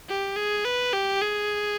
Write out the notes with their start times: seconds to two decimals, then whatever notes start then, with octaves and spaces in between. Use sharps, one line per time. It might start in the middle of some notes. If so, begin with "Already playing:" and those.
0.09 G4
0.36 G#4
0.65 B4
0.93 G4
1.22 G#4